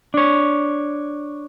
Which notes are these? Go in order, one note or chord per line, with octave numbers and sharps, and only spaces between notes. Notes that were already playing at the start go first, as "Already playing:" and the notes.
D4 C#5